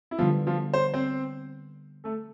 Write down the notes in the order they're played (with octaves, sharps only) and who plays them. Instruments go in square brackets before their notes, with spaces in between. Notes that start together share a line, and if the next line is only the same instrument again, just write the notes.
[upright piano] E4
[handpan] D3 G3 B3 [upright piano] F3 F4
[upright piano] F3 F4
C5
C4 C5
A3 A4